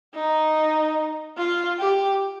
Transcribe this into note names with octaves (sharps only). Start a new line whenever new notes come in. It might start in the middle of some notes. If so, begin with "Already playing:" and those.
D#4
F4
G4